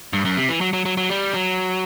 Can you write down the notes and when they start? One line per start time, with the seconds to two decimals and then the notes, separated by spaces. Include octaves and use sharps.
0.13 G2
0.25 F#2
0.37 C3
0.49 E3
0.61 F#3
0.73 F#3
0.85 F#3
0.97 F#3
1.10 G3
1.34 F#3